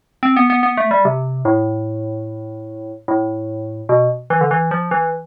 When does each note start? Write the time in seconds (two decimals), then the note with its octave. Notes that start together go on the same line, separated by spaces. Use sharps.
0.23 C4
0.36 B3
0.50 B3
0.63 B3
0.77 A3
0.91 G3
1.05 C3
1.45 A2
3.08 A2
3.89 B2
4.30 E3
4.41 D3
4.51 E3
4.71 F3
4.91 E3